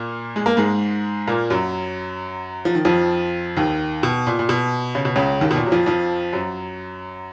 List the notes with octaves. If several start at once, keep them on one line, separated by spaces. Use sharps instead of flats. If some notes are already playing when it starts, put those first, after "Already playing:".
Already playing: A#2 A#3
G#3
A#3
G#2 G#3
A#2 A#3
F#2 F#3
F3
D#3
F2 F3
D#2 D#3
B2
A#2
A#2
B2
C#3
B2
C#2 C#3
D#2 D#3
B2
A#2
F#3
F2 F3
F2 F3
F#2 F#3